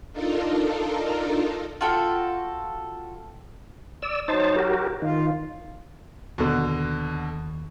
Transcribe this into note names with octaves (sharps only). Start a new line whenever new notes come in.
D4 D#4 F4 A4 A#4
F4 F#4 A4 G5
D5 E6
F#3 D#4 C5 A5
F#4 G4 A#4
D#3 F4
D#2 B2 D3